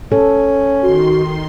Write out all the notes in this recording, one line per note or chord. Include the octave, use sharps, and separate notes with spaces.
C#4 A4
D#3 F#4 C6